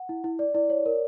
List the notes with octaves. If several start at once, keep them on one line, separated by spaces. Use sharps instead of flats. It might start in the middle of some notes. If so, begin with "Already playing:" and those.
Already playing: F#5
E4
E4
D5
E4 D5
C#5
A#4